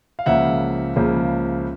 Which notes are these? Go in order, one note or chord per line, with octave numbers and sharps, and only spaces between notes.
F5
C#2 C#3 F3 A#3 E5 F#5
C#2 C#3 F3 A#3